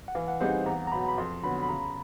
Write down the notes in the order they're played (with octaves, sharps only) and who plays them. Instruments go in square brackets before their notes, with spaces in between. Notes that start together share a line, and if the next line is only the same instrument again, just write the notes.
[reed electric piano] F#5
[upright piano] E3 [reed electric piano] F5
[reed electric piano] F#5
[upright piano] G3 C4 D#4 G#4 [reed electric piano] F#5
[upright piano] E2 [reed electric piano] A#5
[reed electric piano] A#5
[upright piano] B2 F#3 [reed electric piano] B5
[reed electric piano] B5
[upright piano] F2 [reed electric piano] C6
[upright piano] D3 F#3 B3 [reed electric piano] B5
[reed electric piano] B5
[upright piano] C#3 [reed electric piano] A#5